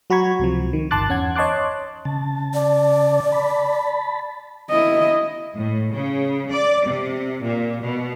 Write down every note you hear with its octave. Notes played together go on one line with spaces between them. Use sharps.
F#3 F#4 A#5 B5 C#6 G#6
C#2 C3 F3
D#3
G1 A5 C6 D6 F#6 A6
E2 C#4 F#5 G#6
C#5 D#5 A5 C6 D6 F#6
C#3 A5
D5
A5 B5
E4 D#5
A2
C#3
D5
C3
A#2
B2